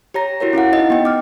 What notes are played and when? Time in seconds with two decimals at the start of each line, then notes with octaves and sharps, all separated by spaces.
0.14 G4 C#5 A#5 A#6
0.40 E4 F#4 A#4 C#5
0.53 C#4 E4 F5 F#5
0.73 D#4 D#5
0.90 B3 G5
1.05 D6 F6